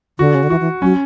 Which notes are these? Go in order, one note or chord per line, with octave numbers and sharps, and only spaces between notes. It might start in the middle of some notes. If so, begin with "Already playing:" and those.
D3 F#4
C#3
D3
E3 F#4
E3
F#3 C#4